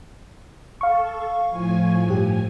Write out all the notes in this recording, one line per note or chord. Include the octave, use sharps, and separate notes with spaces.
A4 F5 C#6
A2 F3 G#5
G2 G4